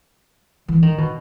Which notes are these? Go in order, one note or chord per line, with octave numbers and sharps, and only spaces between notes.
E3
D#3
B2